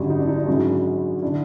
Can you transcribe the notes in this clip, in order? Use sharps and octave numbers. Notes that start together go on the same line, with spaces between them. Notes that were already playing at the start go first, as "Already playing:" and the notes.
Already playing: G#1 F#2 D3 G3
D#4
D4
D#4
D4 E4
G#1 F#2 C#3 F#3
D3 D4 E4